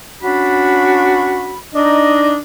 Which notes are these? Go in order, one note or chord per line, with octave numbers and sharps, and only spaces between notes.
C#4 D4 F#4 B5
D4 D#4 D#5